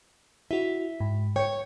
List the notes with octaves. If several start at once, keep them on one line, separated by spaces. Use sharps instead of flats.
E4 F#4 E5
G#2
C#5 G5 C#7